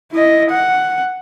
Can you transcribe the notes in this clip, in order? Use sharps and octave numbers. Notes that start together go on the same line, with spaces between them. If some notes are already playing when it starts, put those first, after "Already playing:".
E4 D#5
F#5